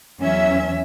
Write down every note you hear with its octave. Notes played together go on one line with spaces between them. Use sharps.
E2 F#3 C#4 E5